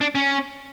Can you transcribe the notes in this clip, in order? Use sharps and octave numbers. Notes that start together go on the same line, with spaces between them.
D4
C#4